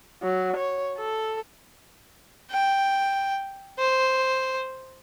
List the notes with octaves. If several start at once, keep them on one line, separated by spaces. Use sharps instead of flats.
F#3
C#5
A4
G5
C5